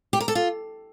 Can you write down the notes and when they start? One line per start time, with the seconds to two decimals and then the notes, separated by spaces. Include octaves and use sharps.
0.13 G4
0.20 A#4
0.28 A4
0.35 F4